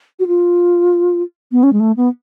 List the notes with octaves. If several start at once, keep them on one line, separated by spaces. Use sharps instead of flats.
F#4
F4
B3
C#4
G#3
A3
B3